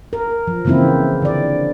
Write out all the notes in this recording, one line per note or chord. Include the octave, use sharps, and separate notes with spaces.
A#4
F3
C#3 E3 A#3 C4 E4
D3 D5